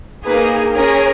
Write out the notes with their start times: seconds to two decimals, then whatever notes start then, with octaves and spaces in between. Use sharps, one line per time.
0.24 A#3 D#4 G#4 B4
0.74 C#4 G#4 A#4